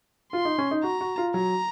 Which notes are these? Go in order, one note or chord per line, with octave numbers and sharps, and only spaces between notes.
F4 C6
D#4
C#4
D#4
F#4 A#5
F#4
F4
F#3 A#5